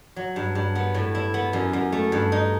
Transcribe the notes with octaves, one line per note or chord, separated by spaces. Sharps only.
F#3
G2
G2
B3
A2
E4
B3
F#2
F#2
A3
G2
D#4